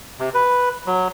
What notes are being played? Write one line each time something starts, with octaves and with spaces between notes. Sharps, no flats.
C3
B4
F#3